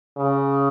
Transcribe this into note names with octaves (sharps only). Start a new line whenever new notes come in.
C#3